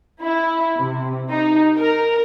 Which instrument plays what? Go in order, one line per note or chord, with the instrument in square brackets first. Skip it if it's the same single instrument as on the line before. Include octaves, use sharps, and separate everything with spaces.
[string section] E4
C3
D#4
A#4